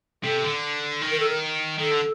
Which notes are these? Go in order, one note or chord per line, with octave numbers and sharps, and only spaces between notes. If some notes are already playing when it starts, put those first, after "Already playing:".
C3 A4
D3
D#3
A#4
A4
A#4
D#3 A4
D3